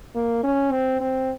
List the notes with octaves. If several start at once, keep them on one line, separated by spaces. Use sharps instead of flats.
A#3
C#4
C4
C4